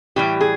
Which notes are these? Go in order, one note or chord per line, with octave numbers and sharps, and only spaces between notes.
A2 E3 G3 G4
G#4